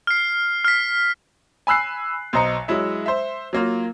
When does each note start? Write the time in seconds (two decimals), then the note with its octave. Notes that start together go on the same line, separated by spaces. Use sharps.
0.07 F6 C7
0.64 F6 B6
1.67 G#5 B5 E6 F#6 C7
2.33 B1 C5 D#5 A#5 C#7
2.68 F#3 G#3 E4 E5
3.06 C5 E5
3.53 F#3 A#3 F4